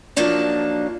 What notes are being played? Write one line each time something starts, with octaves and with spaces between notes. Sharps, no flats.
F3 F#3 A#3 D4 D#4